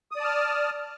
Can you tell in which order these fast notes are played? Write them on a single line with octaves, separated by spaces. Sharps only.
D#6 D5 A5 F6